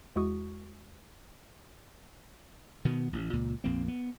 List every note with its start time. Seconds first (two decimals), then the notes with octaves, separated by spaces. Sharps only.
0.16 E2 G#3 E4 F#4 C#6 D#6
2.85 B2 D#3 B3
3.13 A1
3.33 C#2 A#2
3.64 A#1 F2 A#3 C4
3.88 B3